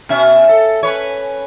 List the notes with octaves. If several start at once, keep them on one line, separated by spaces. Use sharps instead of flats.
B2 C#4 E5
A4
C#4 B4 C#5